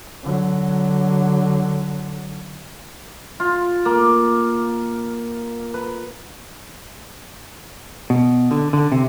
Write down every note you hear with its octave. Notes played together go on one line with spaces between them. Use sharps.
D3 F#3
F4
A#3
B4
B2
D3
D3
C3